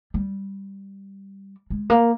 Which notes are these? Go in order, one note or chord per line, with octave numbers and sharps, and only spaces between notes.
G3
G#3
A#3